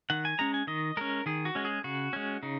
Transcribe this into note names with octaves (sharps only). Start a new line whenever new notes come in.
D#3 F#5
G#5
G#3 C#4 A#5
G#5
D#3 D#5
G#3 C#4 A#4
D#3 G#4
F#4
G#3 C#4
G#4
C#3 F#4
G#3 C#4
C#3 D#4